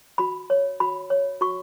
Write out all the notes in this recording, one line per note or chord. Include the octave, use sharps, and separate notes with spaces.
F#4 B5
C#5
F#4 B5
C#5
F#4 C#6